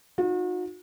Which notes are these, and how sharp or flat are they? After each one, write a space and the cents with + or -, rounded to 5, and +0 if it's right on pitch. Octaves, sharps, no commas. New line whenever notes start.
D#4 +0 F#4 -40